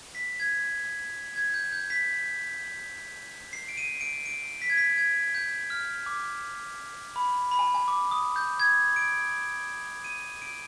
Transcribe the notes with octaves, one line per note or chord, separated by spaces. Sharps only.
B6
G#6
G#6
G6
G6
B6
C7
D7
D#7
D7
D7
B6
G#6
B6
G#6
G6
F6
D6
B5
B5
G#5
G#5
D6
D#6
G6
G#6
D7
D#7
D7